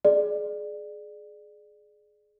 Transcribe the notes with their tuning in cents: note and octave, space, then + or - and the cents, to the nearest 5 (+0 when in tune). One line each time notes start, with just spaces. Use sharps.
G#4 +25 D5 +20